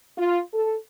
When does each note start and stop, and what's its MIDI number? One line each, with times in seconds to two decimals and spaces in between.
0.17 0.39 65
0.53 0.74 69